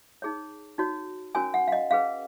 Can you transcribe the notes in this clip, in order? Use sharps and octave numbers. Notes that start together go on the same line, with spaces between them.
D#4 G#4 C#5
D#4 F#4 C#5
C#4 F#4 A#4 C#5 G#5
F#5
F5
D#5
C#4 G#4 B4 F5